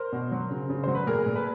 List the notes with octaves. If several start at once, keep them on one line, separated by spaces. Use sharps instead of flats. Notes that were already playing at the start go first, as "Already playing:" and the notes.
Already playing: A#4 C5
B2
F#3
C#3
C#3
F#3 C5
B4
A#2 G#4 A#4
A#2
A4 B4